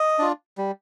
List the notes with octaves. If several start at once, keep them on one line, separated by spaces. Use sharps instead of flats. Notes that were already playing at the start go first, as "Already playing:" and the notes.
Already playing: D#5
D4 F4
G3